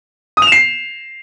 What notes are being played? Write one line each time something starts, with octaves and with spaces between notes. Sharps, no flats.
D#6
F7
E7
C7